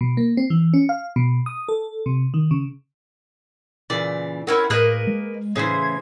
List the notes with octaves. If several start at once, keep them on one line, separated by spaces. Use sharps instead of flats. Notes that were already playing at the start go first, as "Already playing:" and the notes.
B2
A#3
C4
E3
C#4
F5
B2
D#6
A4
C3
D#3
C#3
A#2 C#3 E3 D5
C4 C#4 E4 A#4 C#5 F#5
A2 A#3 G#4 A#4 B4 D#5 F#6
G#3
A2 C#3 E3 G#4 C5 G#6